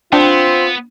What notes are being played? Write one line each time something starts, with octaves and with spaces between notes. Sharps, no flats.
B3 C4 D4 F4 G5